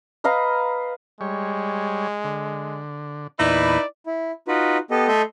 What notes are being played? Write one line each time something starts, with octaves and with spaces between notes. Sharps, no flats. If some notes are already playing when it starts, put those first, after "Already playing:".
B4 D#5 F5 A#5
G3 G#3 C#5
D3
E2 A#2 D#4 E4 B4 D5
E4
D#4 F4 F#4 B4
B3 G4 A4 D#5
A3 A4 D#5 E5 C6 G6